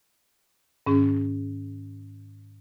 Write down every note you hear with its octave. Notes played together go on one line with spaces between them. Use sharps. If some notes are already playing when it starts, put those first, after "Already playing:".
G#2 D#3 C#4 G#4